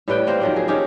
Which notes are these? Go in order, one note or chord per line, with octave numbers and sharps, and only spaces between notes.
A2 G3 B4 G5
A#3 C4 A#4 C5
D#3 F3 F#3
G#4
C#4 D#4 G4